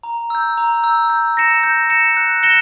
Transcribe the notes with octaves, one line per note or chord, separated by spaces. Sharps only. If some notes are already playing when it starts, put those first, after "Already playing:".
A#5
E6 G6
A#5
E6 G6
G6
A#6 C#7 E7
G6
A#6 C#7 E7
F#6
A#6 C#7 E7 G7